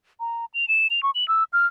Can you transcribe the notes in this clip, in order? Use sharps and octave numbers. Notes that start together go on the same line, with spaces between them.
A#5
F7
E7
F7
C#6
F#7
E6
F6